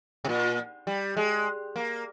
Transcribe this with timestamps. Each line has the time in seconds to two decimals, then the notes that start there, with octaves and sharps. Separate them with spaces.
0.25 C3
0.29 A#2
0.87 G3
1.17 G#3
1.76 A#3